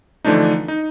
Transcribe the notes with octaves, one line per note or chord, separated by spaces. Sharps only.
D3 E3 F3 A3 D4 D#4
D#4